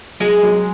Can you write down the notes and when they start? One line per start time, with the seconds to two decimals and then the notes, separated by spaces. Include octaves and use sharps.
0.20 F#3 G#3
0.43 F#3